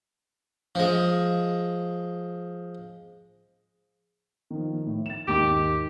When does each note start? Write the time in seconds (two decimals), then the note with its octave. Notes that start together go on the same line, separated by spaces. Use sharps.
0.75 F3 G#3
4.50 D#3 F3
4.86 A2
5.06 A6 E7
5.28 D#2 G#2 G4 D6